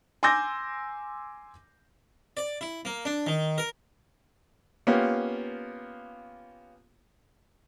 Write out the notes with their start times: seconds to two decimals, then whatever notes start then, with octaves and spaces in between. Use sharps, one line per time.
0.23 G#5 C6 D6 E6 G6 A#6
2.37 D5
2.61 E4
2.85 A#3
3.05 D4
3.27 D#3
3.58 A#4
4.87 A#3 B3 C#4 F4 G4